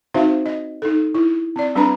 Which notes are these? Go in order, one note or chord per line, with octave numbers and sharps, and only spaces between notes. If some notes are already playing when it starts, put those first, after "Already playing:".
C4 D#4 F#4 C5 E5 F5
D#5
D#4 A4
E4
C4 D5
G3 C4 D4 B4 A#5